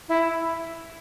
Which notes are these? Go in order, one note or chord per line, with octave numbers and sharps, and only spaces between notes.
E4